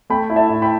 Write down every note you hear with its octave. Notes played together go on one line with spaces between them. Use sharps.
A3 G5 B5
E4
E5 A5
A2
G5 B5